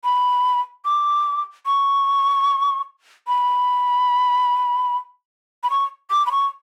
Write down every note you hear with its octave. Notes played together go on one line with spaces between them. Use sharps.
B5
D6
C#6
B5
B5
C#6
D6
B5
C#6